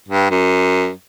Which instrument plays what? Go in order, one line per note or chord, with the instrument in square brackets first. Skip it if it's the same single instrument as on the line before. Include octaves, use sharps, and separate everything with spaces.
[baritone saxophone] G2
F#2